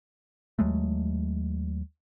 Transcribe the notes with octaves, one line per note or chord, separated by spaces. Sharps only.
D#2 F#3 G#3 A3